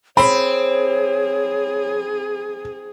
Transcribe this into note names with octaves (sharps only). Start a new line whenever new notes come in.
C4 G#4 C#5 B5